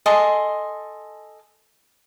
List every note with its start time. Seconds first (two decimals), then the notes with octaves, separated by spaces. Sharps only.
0.06 A4 D#5 G#5 C6